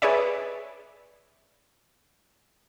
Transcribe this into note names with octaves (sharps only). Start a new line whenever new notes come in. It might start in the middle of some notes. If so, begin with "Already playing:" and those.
G#4 B4 C#5 D5 E5